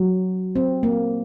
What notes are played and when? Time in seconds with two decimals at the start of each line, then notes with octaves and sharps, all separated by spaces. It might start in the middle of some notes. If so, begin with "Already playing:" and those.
Already playing: F#3
0.56 C4
0.83 A#3